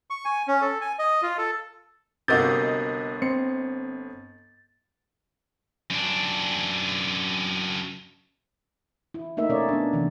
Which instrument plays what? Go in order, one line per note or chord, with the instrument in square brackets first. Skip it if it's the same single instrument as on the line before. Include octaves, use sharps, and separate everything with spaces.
[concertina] C#6
G#5
C#4
A4
G#5
D#5
F4
A4
[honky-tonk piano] G1 D#5 G6 [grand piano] C3 A#3 F#4 [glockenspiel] A6
[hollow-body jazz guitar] C4 [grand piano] C#7
[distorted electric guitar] F#2 D4
[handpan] E4
A3 A#3 D#4 A#4 E5
B2 C#4 C#5 D5
B3 D4
C3 D#3 E3